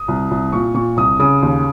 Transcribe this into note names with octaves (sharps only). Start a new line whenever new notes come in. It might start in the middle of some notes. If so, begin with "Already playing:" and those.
Already playing: D#6
C2
C2
A#2 C#6
A#2 C#6
C2 D#6
C#3 D#6
D#2